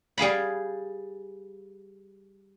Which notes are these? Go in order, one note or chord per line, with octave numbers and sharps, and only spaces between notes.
G3 G#4 F5 B5